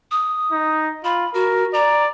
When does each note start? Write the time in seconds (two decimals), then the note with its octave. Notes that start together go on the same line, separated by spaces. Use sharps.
0.11 D#6
0.52 D#4
1.04 F4 B5
1.34 F#4 A#4
1.74 D5 A#5